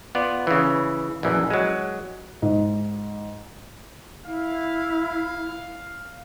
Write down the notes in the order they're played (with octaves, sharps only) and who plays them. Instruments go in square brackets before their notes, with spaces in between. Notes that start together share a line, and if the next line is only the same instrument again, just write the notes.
[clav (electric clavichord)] B3 F4 D5
C#3 E3
A#1 F#2 E3
F#3 G#3
[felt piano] G#2
[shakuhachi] E4 [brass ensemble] F5